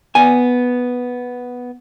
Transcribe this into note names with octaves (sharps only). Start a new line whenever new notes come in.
B3 G#5